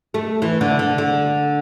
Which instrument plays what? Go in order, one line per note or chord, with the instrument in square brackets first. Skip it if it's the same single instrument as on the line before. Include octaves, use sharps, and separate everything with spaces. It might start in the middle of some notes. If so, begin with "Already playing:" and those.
[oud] A3
E3
D3
D3
D3